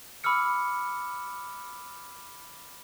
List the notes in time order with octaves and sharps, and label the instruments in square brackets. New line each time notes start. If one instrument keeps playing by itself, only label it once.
[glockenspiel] B5 D6 E6 F6 C#7